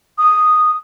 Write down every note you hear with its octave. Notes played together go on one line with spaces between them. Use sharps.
D#6